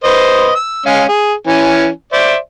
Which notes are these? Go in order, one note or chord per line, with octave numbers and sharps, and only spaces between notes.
B4 C5 D#5
E6
G#3 C#4 F5
G#4
E3 C#4 G#5
C5 D5 E5